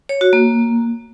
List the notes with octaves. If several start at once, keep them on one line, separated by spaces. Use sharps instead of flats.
C#5
F#4
A#3